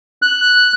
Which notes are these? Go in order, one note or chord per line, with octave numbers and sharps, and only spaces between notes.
F#6